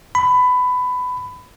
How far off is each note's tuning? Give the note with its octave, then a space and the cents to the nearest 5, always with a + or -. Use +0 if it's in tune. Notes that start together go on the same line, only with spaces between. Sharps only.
B5 +20